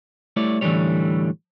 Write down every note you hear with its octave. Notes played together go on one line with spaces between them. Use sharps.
G3 A3 E4 C#5 D5
A2 D3 E3 F#3 G3 C#5